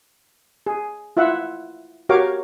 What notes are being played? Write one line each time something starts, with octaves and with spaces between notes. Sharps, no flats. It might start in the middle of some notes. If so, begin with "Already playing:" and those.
G#4
E4 F4 E5 F#5
F#4 G4 A#4 C#5 F5 D6